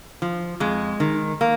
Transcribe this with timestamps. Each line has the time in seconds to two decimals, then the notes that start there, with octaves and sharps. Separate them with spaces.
0.22 F3
0.60 F2 G#3
1.00 D#3
1.41 A#3